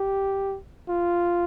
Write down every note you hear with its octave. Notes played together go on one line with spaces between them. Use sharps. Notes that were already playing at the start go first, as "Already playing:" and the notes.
Already playing: G4
F4